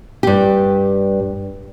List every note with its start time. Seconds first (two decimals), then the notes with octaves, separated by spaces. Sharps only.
0.23 G2 G4